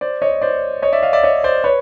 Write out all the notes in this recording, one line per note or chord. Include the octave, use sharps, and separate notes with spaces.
C5 D5
C#5 D#5
C5 D5
C#5 D#5
D5 E5
D#5 F5
D5 E5
C#5 D#5
C5 D5
B4 C#5